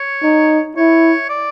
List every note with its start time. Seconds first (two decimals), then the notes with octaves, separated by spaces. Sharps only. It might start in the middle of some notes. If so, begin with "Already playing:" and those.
Already playing: C#5
0.23 D#4
0.77 E4 C#5
1.30 D5